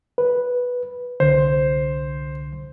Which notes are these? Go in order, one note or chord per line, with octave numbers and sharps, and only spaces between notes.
B4
C2 D3 C5